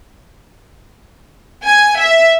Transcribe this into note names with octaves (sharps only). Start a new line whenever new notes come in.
G#5
E5